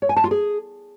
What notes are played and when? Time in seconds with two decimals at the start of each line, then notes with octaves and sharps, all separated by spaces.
0.02 C#5
0.09 G#5
0.16 A5
0.24 F4
0.31 G#4